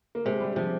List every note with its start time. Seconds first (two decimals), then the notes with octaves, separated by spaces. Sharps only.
0.15 A#3
0.25 C3 G#3
0.41 G3
0.56 C3 F3